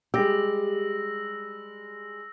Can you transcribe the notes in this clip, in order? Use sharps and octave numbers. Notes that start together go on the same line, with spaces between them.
G3 G#3 G4 E6 A#6